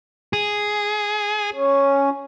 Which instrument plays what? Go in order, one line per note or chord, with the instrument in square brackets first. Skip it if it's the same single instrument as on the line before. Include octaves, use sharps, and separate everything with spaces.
[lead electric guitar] G#4
[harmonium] C#4